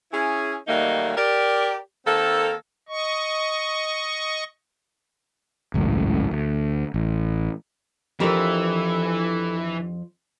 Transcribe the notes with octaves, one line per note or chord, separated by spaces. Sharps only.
C#4 E4 G#4
D#3 F#3 G3 A3 A#3 D#4
G4 A#4 D5
D#3 A#3 C4 A4
D#5 C#6
G#1 C#2 F#2 A2
D2
A1
F2 E3 F3 D4 G4 A4 A#4